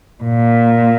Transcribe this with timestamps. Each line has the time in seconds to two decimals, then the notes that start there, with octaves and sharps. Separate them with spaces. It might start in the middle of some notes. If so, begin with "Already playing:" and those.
0.24 A#2